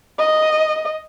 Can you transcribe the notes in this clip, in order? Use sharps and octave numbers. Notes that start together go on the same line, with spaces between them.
D#5